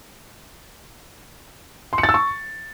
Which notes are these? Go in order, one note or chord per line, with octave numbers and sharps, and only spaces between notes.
C6
C#7
A6
E6
C#6